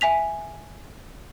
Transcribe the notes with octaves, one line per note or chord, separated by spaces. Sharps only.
E5 G#5 B6 F7